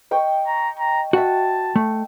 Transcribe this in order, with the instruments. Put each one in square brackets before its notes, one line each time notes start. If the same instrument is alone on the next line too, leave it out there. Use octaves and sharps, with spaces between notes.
[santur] D#5 G5 C#6
[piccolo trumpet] A#5
A#5
[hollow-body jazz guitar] F#4 E5 [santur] G5 [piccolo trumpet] A5
[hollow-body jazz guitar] A3